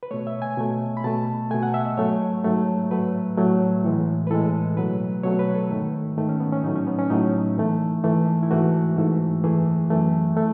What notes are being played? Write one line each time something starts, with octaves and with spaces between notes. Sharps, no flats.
B4
B2 A3 C#5
E5
G#5
B2 A3
B5
B2 A3 A5
B2 A3 G#5
F#5
E5
D#5
G#2 F#3 A3 C#5
G#2 F#3 A3
A2 F#3 A3 B4
A2 F#3 A3
A2 E3 G#3
B4
A2 E3 G#3 A4
B2 F#3 A3 B4
B2 F#3 A3 C#5
B4
A4
G#2 D#3 A3
G#2 D#3 A3
C#4
B3
C#4
A2 F#3 A3 D#4
C#4
B3
C#4
A2 F#3 A3 D#4
G#2 E3 A3
G#2 E3 A3
E4
G#2 E3 A3 F#4
G#2 E3 A3
F#2 E3 A3 G#4
F#2 E3 A3
A3